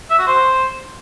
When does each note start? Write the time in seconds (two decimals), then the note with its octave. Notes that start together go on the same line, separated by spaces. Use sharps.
0.10 E5
0.19 F#4
0.27 C5